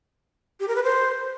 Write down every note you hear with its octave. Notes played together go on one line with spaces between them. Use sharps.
G4
A#4
B4
C5